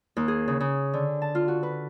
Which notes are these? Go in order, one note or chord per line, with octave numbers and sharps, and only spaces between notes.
D#2
G#4
C#3
C#3
D3
A5
F4
F#4
B4